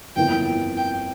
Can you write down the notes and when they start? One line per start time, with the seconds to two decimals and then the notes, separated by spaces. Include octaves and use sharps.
0.16 G1 F2 E3 A#3 G5
0.77 G5